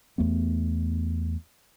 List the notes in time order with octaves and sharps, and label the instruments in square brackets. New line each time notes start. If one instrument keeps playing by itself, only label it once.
[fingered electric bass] E2 A3 B3